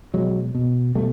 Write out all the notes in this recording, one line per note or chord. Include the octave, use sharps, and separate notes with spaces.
B2 F#3 G#3
B2
B2 G3 A3